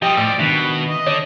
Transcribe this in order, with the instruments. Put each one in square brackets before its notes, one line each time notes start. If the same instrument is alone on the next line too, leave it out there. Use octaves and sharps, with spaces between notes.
[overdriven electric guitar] F3 G3 [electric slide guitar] G4 [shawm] D#5 [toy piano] G5
[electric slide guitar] A2 [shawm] D5 [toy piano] E6
[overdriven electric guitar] B2 [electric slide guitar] D#3 D4 E5 [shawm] B4
[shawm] D#5
[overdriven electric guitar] D3 [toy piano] C#5